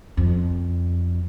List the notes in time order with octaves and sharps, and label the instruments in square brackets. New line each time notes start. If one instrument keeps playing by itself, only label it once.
[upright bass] F2